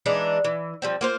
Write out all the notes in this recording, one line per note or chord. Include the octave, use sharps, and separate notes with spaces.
E3 G#3 D4 D#4
E3
F3 G3 C4
A#3 F4 C5